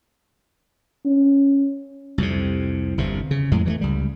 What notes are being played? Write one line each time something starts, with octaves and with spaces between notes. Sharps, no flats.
C#4
C2 F2 C3
G1 E2 C3
C#3
F2 A2 G#3
E3 G#3 A3
C#2 G3